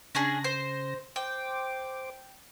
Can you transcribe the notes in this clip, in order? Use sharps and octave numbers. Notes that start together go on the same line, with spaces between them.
C#3 C#4 D4 G#4 A#6
C5
C5 G5 D6